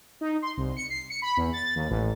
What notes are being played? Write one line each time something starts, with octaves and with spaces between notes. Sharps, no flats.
D#4
C6
C2
C#7
C7
C#7
B5
E2
A6
D#2
A1